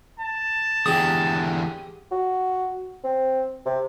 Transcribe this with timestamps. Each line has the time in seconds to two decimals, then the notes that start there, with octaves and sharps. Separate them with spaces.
0.20 A5
0.86 E2 D3 G4 G#4 D#6
2.11 F#4
3.04 C4
3.66 C3